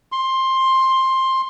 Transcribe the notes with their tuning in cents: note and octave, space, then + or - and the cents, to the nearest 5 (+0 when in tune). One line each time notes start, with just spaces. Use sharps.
C6 +15